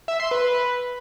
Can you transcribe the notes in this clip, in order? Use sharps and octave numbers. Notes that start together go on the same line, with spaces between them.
E5
C6
B4